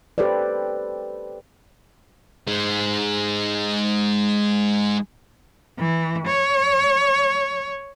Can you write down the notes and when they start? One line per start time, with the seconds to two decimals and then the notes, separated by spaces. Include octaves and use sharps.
0.18 G4 A4 B4 C5 D5
2.47 G#3 D#4
5.78 E3
6.28 C#5